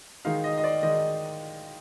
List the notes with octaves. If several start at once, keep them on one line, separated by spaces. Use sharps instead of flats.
D#3 G#3 D#4 F5
D#5
D#5
D5
D#3 G#3 D#4 D#5